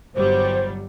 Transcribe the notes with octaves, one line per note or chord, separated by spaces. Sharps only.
G1 F#3 G3 C5